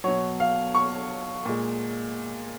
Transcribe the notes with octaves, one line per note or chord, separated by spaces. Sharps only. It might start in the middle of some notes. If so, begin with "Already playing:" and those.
B2 F#3 C#5
F5
C#6
A#2 G#3